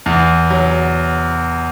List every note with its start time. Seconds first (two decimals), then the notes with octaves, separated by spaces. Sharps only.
0.06 E2
0.50 F#3